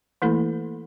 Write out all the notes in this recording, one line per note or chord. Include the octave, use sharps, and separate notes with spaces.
E3 A3 A#3 E4 A4 B5